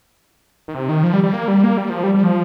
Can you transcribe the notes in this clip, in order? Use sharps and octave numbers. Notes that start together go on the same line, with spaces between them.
D#3
C3
D#3
F3
G3
G3
A#3
G3
A#3
G3
F3
G3
G3
F3